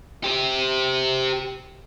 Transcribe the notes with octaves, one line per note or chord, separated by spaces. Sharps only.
G4 C5